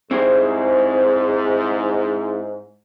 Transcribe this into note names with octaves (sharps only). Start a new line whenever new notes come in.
G#2 C4 E4 C5